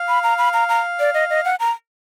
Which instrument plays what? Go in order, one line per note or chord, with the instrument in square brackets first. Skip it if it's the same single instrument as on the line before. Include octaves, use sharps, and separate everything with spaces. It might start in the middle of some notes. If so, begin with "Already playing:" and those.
Already playing: [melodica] F5
[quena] B5
A#5
B5
A#5
A#5
D5
D#5
D#5
F#5
A#5